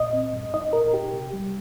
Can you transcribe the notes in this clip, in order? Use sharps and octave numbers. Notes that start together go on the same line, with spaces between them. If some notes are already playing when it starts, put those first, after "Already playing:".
Already playing: A#2 D#5
C4
G2
D#4 D#5
A#2 A#4
D#4 G4
C3
G3